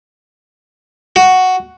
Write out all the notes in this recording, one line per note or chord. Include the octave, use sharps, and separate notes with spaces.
F#4